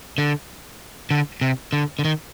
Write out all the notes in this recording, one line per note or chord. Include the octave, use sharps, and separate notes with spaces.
D3
D3
C3
D3
D3
D#3